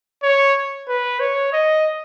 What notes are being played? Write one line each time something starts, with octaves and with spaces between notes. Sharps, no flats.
C#5
B4
C#5
D#5